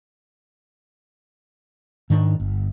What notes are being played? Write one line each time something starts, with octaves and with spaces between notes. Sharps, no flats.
G#2 D#3 D4
G1